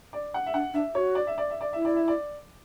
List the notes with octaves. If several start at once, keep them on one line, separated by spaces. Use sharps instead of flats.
D5
F#5
E5
D4 F#5
D4 E5
F#4 C#5
D5
E5
D5
E5
D5
E4 E5
D5
E5
D5